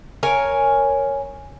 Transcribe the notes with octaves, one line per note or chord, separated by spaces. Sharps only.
A#4 C#5 G#5